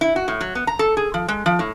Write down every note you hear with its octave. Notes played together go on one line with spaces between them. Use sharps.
E4
F#4
A2
F#3
B3
A#5
A4
G#4
F3
G#3
F3
A2